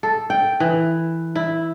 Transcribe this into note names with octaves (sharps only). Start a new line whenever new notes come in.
A4
G5
E3
E4